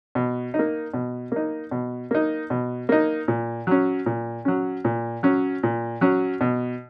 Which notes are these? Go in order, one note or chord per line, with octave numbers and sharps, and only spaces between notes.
B2
D#4
A#3
B2
A#3 D#4
B2
A#3 D#4
B2
A#3 D#4
A#2
F#3 C#4
A#2
F#3 C#4
A#2
F#3 C#4
A#2
F#3 C#4
B2